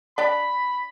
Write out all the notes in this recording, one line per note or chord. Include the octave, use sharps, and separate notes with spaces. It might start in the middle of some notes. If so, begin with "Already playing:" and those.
D4 D5 G5 B5